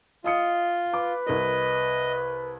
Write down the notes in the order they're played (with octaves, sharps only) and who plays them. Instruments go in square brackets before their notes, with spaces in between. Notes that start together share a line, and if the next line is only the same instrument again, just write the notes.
[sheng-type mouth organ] F4 [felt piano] D#5 D#6 C#7
[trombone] B4 [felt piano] D6
[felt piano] C2 A#4 [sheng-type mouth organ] D#5